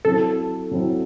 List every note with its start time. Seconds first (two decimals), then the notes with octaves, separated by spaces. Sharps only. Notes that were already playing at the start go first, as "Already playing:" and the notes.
0.05 F#3 C4 E4 A4
0.71 F#3 C4 E4